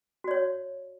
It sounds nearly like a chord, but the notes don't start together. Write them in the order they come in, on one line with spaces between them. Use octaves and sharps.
F#4 D5 C#5